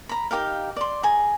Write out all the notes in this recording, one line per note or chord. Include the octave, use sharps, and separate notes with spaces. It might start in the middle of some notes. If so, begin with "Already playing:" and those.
A#5 B5
D#4 G4 A#4 F5
D5 C6
G#4 G#5 A#5